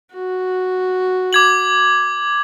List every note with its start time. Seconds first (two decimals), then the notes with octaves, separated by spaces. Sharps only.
0.13 F#4
1.33 D6 G#6 F#7